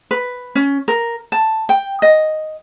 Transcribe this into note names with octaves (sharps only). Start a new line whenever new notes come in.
B4
C#4
A#4
A5
G5
D#5